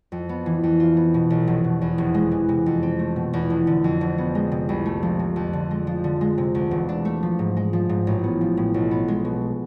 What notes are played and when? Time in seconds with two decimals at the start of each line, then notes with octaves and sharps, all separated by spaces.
0.12 F2
0.29 B3
0.46 E3
0.63 F2
0.80 F4
0.97 B3
1.14 B2
1.30 B1
1.47 F1
1.64 B2
1.81 E2
1.98 F1
2.14 G#3
2.31 E3
2.49 C3
2.66 F2
2.83 C4
2.99 A3
3.16 B2
3.33 E2
3.50 F1
3.67 D3
3.84 F2
4.01 F1
4.18 B3
4.35 G#3
4.52 C3
4.69 C2
4.86 A3
5.03 F3
5.19 C3
5.36 F2
5.53 D3
5.71 G#3
5.87 F3
6.04 D3
6.21 G#3
6.38 C3
6.55 D2
6.71 E1
6.89 D4
7.05 A3
7.23 F3
7.39 G#2
7.56 G#3
7.73 F3
7.89 G#2
8.07 A1
8.24 B3
8.41 F3
8.57 A2
8.74 B1
8.91 B3
9.08 G#3
9.25 B2